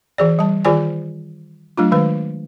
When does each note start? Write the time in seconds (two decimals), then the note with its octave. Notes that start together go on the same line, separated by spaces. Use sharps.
0.18 E3 G#4 D5
0.39 G3 A5
0.65 D#3 F4 G#4 C5 D5 G#5
1.78 F#3 A3 D4 F4
1.92 D#3 G#3 B4